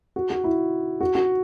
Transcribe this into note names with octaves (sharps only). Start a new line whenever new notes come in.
F#4
F#4
E4
F#4
F#4